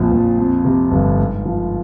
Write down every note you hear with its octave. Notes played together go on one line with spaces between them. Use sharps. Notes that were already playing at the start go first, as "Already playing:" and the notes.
Already playing: A#1 F2 A#2 F4
A#1
F2
C3
G1
G#2
F3